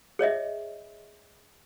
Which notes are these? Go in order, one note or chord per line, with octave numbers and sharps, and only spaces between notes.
G#4 C#5 D#5 E5